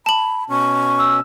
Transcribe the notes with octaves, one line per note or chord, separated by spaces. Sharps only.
A5 B5 F#7
B2 C#4 C#6
E6